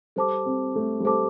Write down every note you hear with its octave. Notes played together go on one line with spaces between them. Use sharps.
G3 A4 C5 A5 D6
C4
A3
G3
A3 A4 C5 A5 D6